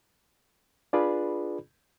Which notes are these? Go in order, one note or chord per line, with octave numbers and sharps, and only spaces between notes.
D4 F4 G#4 B4 D5 B5